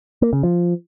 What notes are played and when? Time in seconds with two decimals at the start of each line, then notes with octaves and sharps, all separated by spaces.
0.22 A#3
0.33 C#3
0.43 F3